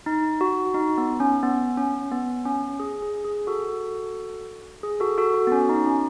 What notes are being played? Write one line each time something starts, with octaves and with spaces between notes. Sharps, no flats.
D#4
F#4
D#4
B3
C#4
B3
C#4
B3
C#4
G#4
G#4
G#4
F#4 A4
G#4
F#4 A4
F#4 A4
F#4
B3
C#4
D#4
C#4